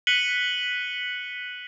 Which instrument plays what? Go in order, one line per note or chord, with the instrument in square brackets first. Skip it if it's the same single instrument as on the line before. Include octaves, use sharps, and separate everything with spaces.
[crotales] F#6 B6 C#7 D#7 F#7 G7